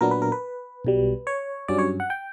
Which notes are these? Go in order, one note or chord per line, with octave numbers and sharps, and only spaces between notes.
A#2 F#3 B3 D4 A#4
B4
A#4
B4
B1 B2 G3
C#5
G2 F#3 C#4 D5
C#5
F#5
G5